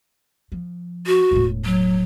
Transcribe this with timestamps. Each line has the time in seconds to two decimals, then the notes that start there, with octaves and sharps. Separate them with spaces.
0.52 F3
1.07 F#4
1.31 E1 A2
1.65 F#3